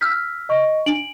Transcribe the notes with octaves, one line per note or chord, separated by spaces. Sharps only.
E6 F6 G6 B6
D#5 C#6
D4 D7 F#7